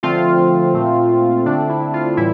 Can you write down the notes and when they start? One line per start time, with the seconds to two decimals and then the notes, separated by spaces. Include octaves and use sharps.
0.03 D3 F3 A3 C4 F4
0.74 A#2 A3 C4
1.46 D3 A3 C4 D4
1.69 E4
1.93 F4
2.17 A2 E3 G3 E4